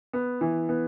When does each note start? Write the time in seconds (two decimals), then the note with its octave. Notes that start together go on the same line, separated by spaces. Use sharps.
0.13 B3
0.41 E3
0.69 B3